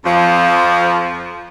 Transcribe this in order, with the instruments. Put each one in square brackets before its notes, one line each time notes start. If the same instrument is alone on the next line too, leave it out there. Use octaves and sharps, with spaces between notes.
[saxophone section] F2 F3